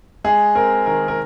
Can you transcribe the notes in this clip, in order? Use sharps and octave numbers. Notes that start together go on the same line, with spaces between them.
G#3 G#4
C4 A#4
D#3 A#4
A#4